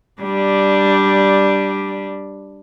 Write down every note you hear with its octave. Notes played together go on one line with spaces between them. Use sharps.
G3 D4